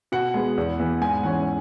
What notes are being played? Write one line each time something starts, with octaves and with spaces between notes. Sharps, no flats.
B2 F#5
G#3 B3
E2
E3 B3
G#2 G#5
E3 C#4 F#5